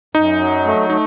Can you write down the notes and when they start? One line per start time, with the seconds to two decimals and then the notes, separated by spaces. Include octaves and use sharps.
0.15 F#2 D#4
0.40 F#3
0.65 A3
0.90 A3 D#4